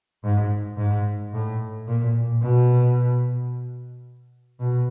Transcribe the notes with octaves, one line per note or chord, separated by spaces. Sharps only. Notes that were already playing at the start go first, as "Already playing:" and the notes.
G#2
G#2
A2
A#2
B2
B2